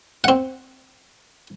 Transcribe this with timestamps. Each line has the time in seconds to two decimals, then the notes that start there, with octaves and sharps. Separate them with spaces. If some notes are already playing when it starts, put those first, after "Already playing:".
0.24 C4 F#5